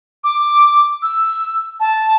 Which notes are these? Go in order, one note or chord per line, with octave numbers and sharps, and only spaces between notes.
D6
E6
A5